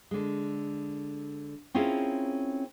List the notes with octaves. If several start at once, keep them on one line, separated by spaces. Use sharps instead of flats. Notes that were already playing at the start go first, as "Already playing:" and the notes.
D3 G#3
C4 C#4 E4 F4 G#4 A#4